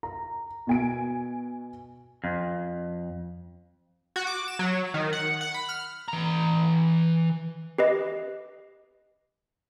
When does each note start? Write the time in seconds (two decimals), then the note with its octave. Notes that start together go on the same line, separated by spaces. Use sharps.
0.03 A#5
0.67 B2 G#5 D7
2.24 F2
4.16 F#4
4.27 D6
4.48 E7
4.59 F#3
4.94 D#3
5.13 F#5
5.41 F#5
5.54 B5
5.69 F6
6.08 E3 A#5
7.78 G4 B4 D#5